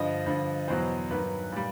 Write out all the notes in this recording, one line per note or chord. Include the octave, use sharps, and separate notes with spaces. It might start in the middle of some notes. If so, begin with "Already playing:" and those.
Already playing: G2 D3 F3 D#5
G2 D3 F3
E2 B2 F#3 C5
G2 D#3 F#3 B4
A#2 G3